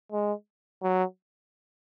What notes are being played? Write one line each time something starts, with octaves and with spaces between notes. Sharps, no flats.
G#3
F#3